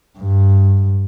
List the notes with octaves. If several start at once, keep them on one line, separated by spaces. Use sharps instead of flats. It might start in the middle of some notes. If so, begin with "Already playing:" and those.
G2